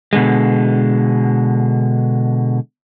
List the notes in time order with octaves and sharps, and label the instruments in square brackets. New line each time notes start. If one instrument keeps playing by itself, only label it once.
[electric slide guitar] B2 D3 G#3